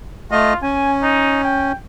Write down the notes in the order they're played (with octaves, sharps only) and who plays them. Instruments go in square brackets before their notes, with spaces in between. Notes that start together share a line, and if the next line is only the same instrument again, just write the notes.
[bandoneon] A3 D#5 [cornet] F4
[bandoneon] C#4 [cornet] G#5
[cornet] D#4
G5